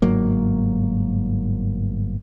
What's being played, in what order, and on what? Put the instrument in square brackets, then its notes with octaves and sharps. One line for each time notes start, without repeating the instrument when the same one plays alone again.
[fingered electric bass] G1 G#2 F#3 A#3